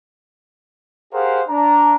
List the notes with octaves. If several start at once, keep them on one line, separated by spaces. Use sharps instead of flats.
G4 G#4 A#4 C5 F5 F#5
D4 A#5